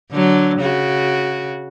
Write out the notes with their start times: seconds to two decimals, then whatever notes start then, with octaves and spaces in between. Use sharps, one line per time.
0.11 D3 F#3
0.60 C#3 F#4